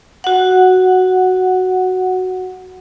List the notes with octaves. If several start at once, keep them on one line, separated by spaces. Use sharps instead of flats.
F#4 F#5